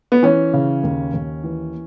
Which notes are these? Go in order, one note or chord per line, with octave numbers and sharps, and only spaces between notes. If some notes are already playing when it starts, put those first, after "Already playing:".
B3
E3 C#4
C#3
D#2
D#2
E3